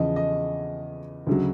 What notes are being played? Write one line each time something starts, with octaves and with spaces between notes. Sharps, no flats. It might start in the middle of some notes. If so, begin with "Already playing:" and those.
Already playing: E2 C#3 F3 D#5
D#5
D2 C#3 F#3